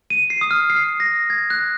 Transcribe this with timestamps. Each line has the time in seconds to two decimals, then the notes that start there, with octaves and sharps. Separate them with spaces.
0.10 D#7
0.30 C7
0.41 D#6
0.51 F6
0.70 C7
1.00 A#6
1.30 G#6
1.50 F#6